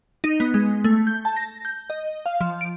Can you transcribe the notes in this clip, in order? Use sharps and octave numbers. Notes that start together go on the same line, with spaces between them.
D#4
B3
G#3
A3
G6
A5
A#6
G6
D#5
F5
F3
D7